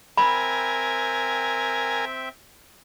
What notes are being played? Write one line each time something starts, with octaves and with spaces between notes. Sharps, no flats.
C4 A#4 E5 G5 G#5 B5